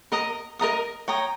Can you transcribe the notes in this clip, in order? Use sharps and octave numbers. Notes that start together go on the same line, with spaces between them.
A#4 D#5 A#5 D#6
A#4 D#5 A#5 D#6
C#5 G5 A#5 D#6